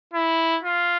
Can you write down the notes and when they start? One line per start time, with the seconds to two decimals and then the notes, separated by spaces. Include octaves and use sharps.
0.14 E4
0.63 F4